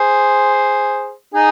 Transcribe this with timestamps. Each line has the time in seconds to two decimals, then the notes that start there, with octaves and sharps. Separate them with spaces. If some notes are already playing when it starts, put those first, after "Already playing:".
Already playing: G#4 C5
1.34 D#4 G#4